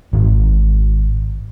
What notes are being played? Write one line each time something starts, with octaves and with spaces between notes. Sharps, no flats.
G#1